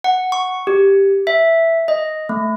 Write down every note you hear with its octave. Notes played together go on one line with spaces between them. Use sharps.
F#5
C#6
G4
E5
D#5
A3